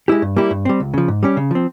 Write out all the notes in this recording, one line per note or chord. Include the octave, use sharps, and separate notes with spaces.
G#3 E4 G4
G2
G3 A#3 E4 G4
G2
G3 C4
C#2
C#3 F3
G#2
G3 C#4 G4
C#3
F3 C4